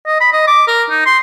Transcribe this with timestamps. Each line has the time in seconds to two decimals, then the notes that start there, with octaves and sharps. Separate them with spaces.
0.06 D#5
0.21 B5
0.32 D#5
0.47 D6
0.68 A#4
0.90 D#4
1.06 C6